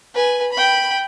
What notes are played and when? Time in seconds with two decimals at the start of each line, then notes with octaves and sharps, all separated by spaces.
0.14 B4 G#5
0.52 G5 B5